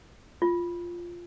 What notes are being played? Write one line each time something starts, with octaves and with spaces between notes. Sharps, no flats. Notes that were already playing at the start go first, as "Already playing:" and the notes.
F4